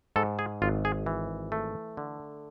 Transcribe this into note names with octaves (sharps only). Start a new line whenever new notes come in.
G#2 A4
G#4
G#1 F4
G#4
E3
A3
D3